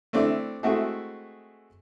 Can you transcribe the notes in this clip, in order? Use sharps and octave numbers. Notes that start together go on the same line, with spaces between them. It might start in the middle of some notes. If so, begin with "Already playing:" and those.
A3 C4 D4 E4
G#3 A3 C4 E4 F#4 G#4